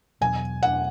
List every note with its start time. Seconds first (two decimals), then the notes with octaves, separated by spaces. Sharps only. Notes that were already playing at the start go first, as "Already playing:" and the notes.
0.21 E2 B2 F#3 B3 G#5
0.63 F#5